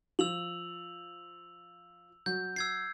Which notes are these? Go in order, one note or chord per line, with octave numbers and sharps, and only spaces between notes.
F3 E6 F7 F#7
F#3 G6
E6 G#6 C7